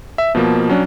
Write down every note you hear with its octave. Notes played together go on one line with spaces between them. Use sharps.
E5
B2 F3 A#3
F#3 C#4 D4